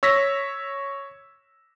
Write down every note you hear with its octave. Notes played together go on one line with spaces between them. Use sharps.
C#5 E6 A#6 B6